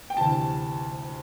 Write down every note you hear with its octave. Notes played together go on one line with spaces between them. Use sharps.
G5
D2 C3 E3 A5